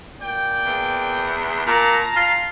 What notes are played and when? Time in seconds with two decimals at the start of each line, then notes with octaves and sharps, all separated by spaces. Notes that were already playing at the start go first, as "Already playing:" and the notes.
0.21 A#2 D5 G5
0.65 E2
1.67 A#2 A5 A#5
2.16 F4